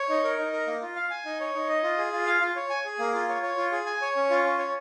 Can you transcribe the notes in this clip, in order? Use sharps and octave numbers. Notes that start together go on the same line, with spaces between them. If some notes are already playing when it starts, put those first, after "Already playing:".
Already playing: C#5
D#4
A#4
D#4
A#4
A#3
F4
F5
G#5
D#4
C#5
D#4
D#5
F4
G#4
F4
F5
F4
C#5
G#5
G#4
A#3
F4
C#5
C#5
F4
G#4
G#5
C#5
C#4
F4
C#4
C#5